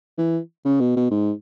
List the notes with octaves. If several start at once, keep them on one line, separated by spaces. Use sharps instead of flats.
E3
C#3
B2
B2
G#2